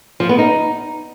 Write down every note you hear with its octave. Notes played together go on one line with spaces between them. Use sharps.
F3
B3
D#4